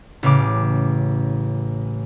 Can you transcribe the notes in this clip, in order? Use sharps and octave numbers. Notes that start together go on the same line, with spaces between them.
A1 C#3 D6